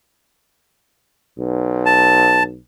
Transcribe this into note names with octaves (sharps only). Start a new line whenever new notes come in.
B1
A5